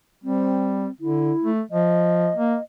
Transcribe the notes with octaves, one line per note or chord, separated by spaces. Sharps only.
G3 C4
D3 E4
A3
F3 D#5
A#3